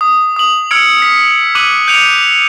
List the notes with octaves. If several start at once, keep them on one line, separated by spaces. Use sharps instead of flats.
D#6
D#6 F#7
E6 F6 G#6 C#7 D7
B6
D6 E6 F#6 D#7 F#7
G6 C#7 D7 F7 F#7